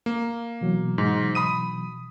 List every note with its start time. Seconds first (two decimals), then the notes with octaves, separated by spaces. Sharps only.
0.06 A#3
0.61 B2 E3 F#3
0.98 G#2
1.35 B5 D#6 D#7